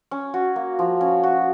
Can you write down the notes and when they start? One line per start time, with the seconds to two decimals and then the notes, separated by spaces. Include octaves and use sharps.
0.11 C#4
0.34 F#4
0.56 A#3
0.79 F3
1.01 C#4
1.23 F#4